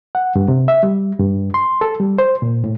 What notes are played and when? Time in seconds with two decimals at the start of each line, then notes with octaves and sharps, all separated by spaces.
0.15 F#5
0.36 G2
0.48 C3
0.68 E5
0.83 G3
1.19 G2
1.54 C6
1.81 A4
2.00 G3
2.18 C5
2.42 A#2
2.64 A2